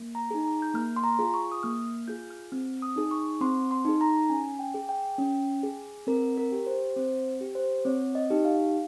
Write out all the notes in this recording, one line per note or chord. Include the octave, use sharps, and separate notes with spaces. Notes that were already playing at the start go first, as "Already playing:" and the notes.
Already playing: A#3
A#5
D#4 G#4
A#5
G6
A#3 F6
C6
A#5
F4 G#4
C#6
D#6
A#3 F6
F6
F4 G#4 G6
F6
C4 F6
D#6
D#4 G#4
C#6
C4 C6
C6
D#4 G#4
A#5
C#4 G#5
G5
G#4
G5
C#4
G#4
C4 A#4
A#4
G4
C5
C4 C5
G4
C5
C4 C#5
D#5
D#4 G4
F5